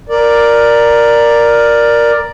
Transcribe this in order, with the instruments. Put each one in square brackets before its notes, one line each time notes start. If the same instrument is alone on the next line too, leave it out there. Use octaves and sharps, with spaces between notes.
[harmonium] A#4 D5